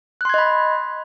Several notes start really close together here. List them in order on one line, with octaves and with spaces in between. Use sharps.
F#6 C6 G#6 D#5 B5